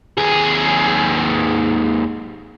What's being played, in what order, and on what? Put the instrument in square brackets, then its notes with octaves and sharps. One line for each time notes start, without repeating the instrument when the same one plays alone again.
[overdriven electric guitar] D#2 G#4